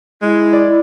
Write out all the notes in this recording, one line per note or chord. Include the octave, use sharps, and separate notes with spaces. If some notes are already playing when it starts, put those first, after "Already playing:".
G#3 E4
D5